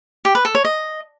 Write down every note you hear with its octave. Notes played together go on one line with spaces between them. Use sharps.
G4
B4
A4
C#5
D#5